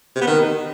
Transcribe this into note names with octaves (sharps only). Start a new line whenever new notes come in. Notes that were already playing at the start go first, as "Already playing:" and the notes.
C3
B3
D#3